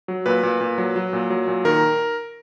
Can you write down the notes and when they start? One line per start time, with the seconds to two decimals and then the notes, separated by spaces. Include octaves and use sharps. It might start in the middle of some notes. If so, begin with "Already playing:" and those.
0.08 F#3
0.26 A#2 B4
0.43 A#2
0.61 A#2
0.78 F#3
0.96 F#3
1.13 A#2
1.30 F#3
1.48 A#2
1.65 D#3 A#4